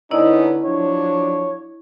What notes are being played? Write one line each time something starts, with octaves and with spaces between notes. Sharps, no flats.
D3 B3 C#4 D#4 E4 D5 D#5
F3 F#3 D4 C#5